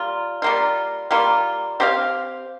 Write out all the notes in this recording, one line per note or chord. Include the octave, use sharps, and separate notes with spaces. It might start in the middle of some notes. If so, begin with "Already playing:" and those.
Already playing: G3 A#3 F4
G3 A#3 F4
G3 A#3 F4
C4 G4 C5 F5